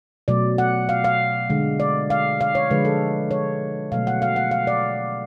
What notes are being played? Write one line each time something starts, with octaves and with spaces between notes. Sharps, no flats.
B2 F#3 A3 D5
F#5
F5
F5
D3 G#3
D5
F5
F5
C#5
D3 F3 G#3 B4
A4
C#5
B2 F#3 A3 F5
F#5
F5
F#5
F5
D5